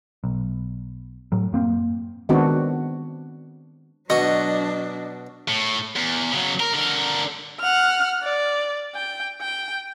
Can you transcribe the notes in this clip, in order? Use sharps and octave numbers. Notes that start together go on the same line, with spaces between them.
B1
A2 F#3
F#2 A#3 C4
D#3 G#3 B3 C4 D4 F#4
B2 F#3 D4 F#4 D#5
A2
E2
C#3 F#3
A#4
D3 A#4
F#5 F6
D5
G5
G5